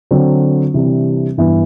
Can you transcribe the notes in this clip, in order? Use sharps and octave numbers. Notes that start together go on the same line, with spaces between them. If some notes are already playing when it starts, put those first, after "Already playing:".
D3 F#3 C4
C3 E3 G3 D4
G2 E3 B3